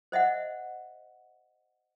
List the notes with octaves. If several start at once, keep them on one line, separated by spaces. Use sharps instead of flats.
C5 D#5 E5 F#5